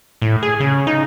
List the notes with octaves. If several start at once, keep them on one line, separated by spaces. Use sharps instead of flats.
A2
G#4
C#3
D#4